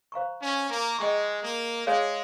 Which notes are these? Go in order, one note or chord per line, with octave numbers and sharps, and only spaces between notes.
C5 F5 A#5 C#6
C#4
A#3
G#3 G#4 D#5 G5 A#5 C#6
A#3
G#3 G#4 C#5 F5